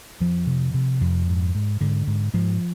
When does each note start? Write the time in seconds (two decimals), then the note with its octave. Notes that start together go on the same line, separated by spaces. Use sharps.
0.20 F2 F3
0.47 C3
0.74 C3
1.01 F2
1.28 G#2
1.55 G#2
1.81 G#2 D3
2.07 G#2
2.34 G#2 F3